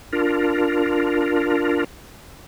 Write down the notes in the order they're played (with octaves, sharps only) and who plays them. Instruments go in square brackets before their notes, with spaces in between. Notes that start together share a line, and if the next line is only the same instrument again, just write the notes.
[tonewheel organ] D4 F4 A#4